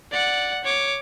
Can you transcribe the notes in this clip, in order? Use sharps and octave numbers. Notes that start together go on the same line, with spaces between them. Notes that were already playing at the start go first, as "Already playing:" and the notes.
D5 F#5
C#5 D6